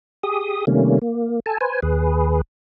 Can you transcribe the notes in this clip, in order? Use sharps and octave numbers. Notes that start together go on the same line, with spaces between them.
G4 G#4 D#6
C3 D#3 G3 A3 A#3 C#4
A#3
A4 G#5 A5
B4 C5 G#5
D#2 G#4 B4